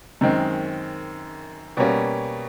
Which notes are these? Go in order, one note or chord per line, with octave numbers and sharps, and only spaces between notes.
F#2 D#3 G#3 C4
B2 G3 A#3 C#4